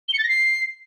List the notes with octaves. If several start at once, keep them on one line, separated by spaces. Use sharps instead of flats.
G7
C#7
A6
A#6
C7